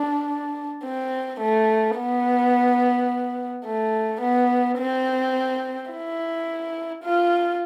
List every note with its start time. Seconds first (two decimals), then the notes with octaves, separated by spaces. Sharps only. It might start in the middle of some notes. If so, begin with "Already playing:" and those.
Already playing: D4
0.84 C4
1.40 A3
1.97 B3
3.66 A3
4.21 B3
4.78 C4
5.91 E4
7.04 F4